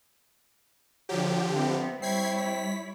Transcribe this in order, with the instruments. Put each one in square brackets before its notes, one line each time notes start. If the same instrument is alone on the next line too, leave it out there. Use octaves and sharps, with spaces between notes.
[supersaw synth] D3 F3 G4 [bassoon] F#3
[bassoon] C3 [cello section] B3 C4
[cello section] G3 E4 C#5 [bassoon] C4 [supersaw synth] G#6 B6 C7
[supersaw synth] B6